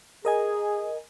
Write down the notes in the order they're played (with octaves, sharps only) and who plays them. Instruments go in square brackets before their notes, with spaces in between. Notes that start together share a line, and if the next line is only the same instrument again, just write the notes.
[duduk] G#4 [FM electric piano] A#4 D#5 G#5